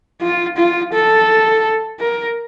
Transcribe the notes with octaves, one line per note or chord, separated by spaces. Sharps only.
F4
F4
A4
A#4